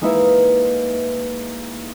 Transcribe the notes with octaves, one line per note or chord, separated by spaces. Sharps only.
G#3 A#3 D#4 E4 B4 E5